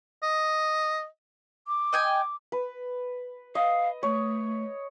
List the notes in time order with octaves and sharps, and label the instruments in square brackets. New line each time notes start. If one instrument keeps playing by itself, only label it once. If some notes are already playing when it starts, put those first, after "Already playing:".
[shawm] D#5
[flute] D6
[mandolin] D#5 G5 G#5
[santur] B4
[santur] D#5 [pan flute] F5
[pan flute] A3 [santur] C#5